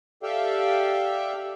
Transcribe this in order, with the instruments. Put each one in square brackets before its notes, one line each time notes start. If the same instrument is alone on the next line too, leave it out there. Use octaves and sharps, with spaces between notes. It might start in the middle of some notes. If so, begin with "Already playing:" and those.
[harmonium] G4 A4 D5 E5 F5 G5